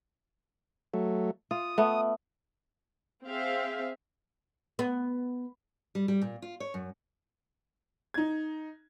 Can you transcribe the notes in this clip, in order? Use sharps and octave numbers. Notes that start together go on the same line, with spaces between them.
F#3 A3
F4 D#6
A3 B3
C4 G#4 E5 F5
B3
G3
G3
A#2
F4
C#5
F#2
D#4 G#6